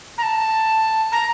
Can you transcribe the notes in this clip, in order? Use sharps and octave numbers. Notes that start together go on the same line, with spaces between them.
A#5
A5
A#5